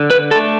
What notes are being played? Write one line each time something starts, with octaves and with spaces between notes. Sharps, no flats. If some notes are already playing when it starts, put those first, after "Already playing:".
Already playing: D3
B4
A3 D4 A4